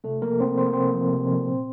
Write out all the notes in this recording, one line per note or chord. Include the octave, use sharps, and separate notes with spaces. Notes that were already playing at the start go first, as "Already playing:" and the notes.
C3 A3 A4
F3 A#3 A#4
C3 C4 C5
F3 C5
A#4
C3 C4 C5
F3
C3
F3
A#2